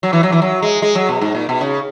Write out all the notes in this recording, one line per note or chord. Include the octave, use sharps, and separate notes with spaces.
F#3
E3
F#3
E3
F#3
G#3
G#3
F#3
B2
G#2
A#2
B2
C#3